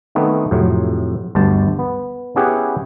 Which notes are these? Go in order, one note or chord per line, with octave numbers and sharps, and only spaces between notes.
D#3 A3 B3 C4 D4 D#4
F2 A2 C3 F#3
G1 D2 G2 C5 A5
B3
B3 C#4 E4 G4 G#4 F#5